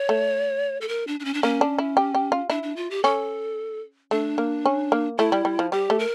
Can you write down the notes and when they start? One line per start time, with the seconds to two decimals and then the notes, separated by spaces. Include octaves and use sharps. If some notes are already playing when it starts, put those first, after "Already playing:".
Already playing: C#5
0.09 A3
0.81 A4
0.88 A#4
1.07 D4
1.20 D4
1.25 C#4
1.34 D4
1.43 A#3 C#4
1.61 D4
1.78 E4
1.97 G4
2.15 G4
2.32 F4
2.50 D4 E4
2.63 D4
2.76 F4
2.91 G4
3.04 C#4 A4
4.11 A3 D4
4.38 A#3
4.66 C#4
4.92 A#3
5.18 A3 E4
5.32 G3
5.45 G3
5.59 F3
5.72 G3 G4
5.90 A3
5.99 A#4